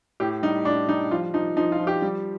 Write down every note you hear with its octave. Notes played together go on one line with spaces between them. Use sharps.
A2 G4
G3 D#4
A2 D4
G3 D#4
F3 F4
F3 D#4
F3 D#4
F4
F3
G4
G3